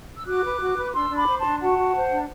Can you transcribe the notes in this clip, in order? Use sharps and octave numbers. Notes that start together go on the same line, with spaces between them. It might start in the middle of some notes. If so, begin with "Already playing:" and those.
E6
F#4 D6 F#6
B4
F#4
B4
D4 C6 E6
D4
B5 D6
C5
A5 C6
D4
F#4 F#5 A5
F#4
C5
D4